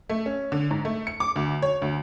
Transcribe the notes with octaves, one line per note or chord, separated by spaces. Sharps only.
A3
C#4
D3
G#2
A3
C#7
D6
D2
C#5
D2